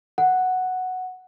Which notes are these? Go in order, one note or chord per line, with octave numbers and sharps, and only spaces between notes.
F#5